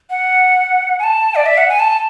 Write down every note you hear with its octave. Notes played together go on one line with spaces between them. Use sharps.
F#5
G#5
A5
D5
E5
F#5
G#5
A5